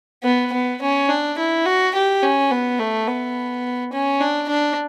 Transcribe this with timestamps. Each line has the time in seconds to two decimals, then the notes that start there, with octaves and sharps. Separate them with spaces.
0.24 B3
0.52 B3
0.82 C#4
1.09 D4
1.38 E4
1.66 F#4
1.95 G4
2.23 C#4
2.51 B3
2.79 A3
3.07 B3
3.93 C#4
4.21 D4
4.49 D4